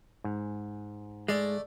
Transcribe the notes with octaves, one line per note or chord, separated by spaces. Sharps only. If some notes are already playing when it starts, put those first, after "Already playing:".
G#2
G#3 A3 D5